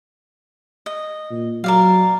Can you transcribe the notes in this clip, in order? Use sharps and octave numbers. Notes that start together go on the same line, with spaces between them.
D#5
A#2
F#3 A#4 D5 F5